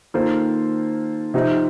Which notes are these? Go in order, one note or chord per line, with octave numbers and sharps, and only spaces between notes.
D#3 A#3 F4 A4 C5
C3 F3 C4 D#4